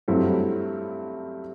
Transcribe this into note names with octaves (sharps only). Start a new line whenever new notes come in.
G2 F#3 A3 C4 E4